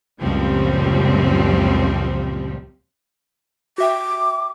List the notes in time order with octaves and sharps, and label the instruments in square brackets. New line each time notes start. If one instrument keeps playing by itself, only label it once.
[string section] C#2 F#2 A#2 F3 G3 C4
[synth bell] F#4 E5 G5 [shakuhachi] D6